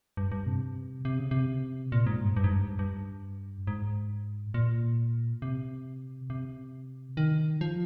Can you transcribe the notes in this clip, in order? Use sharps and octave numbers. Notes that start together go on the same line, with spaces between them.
G2
G2
C3
C3
C#3
C3
A#2
G#2
G2
G2
G#2
G2
G2
G#2
A#2
C3
C3
D#3
F3